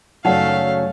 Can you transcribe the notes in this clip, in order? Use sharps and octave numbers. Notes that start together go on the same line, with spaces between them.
F#2 C#3 F#3 A3 D#4 D5 F5 F#5